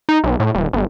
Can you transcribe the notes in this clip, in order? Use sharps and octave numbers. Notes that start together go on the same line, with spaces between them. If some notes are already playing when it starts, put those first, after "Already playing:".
D#4
B1
A2
D#1
G1